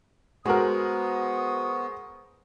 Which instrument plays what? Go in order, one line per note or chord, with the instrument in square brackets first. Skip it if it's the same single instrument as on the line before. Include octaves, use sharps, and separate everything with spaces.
[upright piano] G#3 A#4 [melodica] B3 [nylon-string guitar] F#4 [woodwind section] C5 C#6 D#6